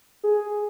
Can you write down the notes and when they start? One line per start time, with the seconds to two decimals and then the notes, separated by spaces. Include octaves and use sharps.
0.23 G#4